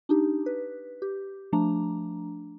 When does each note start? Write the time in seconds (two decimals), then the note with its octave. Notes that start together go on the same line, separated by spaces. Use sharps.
0.09 D4 D#4 G4
0.46 B4
1.02 G4
1.53 F3 A3 D4 A#5